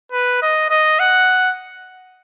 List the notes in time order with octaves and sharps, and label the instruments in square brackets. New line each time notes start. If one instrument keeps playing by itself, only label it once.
[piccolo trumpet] B4
D#5
D#5
F#5